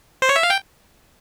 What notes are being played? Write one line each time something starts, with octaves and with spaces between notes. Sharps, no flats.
C5
C#5
E5
F5
G5